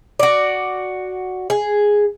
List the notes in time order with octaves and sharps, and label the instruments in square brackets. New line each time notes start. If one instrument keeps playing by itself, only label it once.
[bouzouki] F#4 D5
G#4